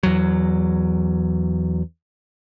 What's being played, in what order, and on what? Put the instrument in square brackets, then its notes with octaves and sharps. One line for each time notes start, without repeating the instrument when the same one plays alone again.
[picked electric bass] E2 F#3